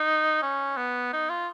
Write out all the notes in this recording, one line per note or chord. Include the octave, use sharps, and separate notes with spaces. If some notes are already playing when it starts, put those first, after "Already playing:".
Already playing: D#4
C#4
B3
D#4
F4